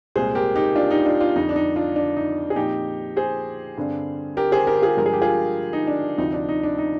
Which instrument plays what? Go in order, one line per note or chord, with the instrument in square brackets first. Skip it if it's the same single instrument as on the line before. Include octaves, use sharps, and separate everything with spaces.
[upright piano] C2 A#2 G#3 G#4 C5
G4 A#4
D#4 G4
D4 F4
D#4 G4
D4 F4
D4 F4
F2 D3 G3 D#4
D4
D#4
D4 F4
D4
D#4
G#4
A#2 F3 C4 D#4 G4
G#4 C5
G2 D3 G3 C4
G4 A#4
G#4 C5
G4 A#4
F4 G#4
G2 D3 F3 G#3 A#4
G#4
G4
F4 G#4
D#4
D4
D2 C3 F3 C4 D#4
D4
D#4
D4
D#4